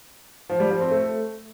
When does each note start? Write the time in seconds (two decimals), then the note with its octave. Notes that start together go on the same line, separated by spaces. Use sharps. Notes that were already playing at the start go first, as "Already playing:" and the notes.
0.49 F3
0.60 G3
0.70 F3
0.81 C4
0.91 A3